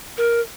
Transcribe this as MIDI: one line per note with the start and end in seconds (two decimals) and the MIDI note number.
0.18 0.40 70